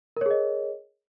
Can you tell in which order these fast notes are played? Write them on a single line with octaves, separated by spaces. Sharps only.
A#4 C#5 G#4 D#5